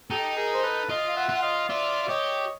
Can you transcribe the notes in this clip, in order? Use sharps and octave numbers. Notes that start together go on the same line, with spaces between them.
D#4 G4 A4
G#4 A#4
C5
A4 B4
F4 D#5 F5
F5
E5 F#5
F4
F#5
D#5 F5
F4 D5 E5
D5
G4 C#5 D#5